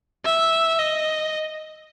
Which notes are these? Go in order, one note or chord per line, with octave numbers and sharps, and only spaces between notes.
E5
D#5